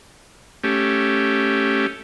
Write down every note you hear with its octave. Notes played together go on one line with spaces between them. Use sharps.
A3 C#4 G4